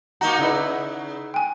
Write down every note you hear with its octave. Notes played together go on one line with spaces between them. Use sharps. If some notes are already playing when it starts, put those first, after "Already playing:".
A#3 D#4 F#4 A#5
C#3 D#4 E4 B4
G5 G#5